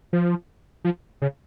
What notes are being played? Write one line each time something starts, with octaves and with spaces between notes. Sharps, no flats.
F3
F3
C#3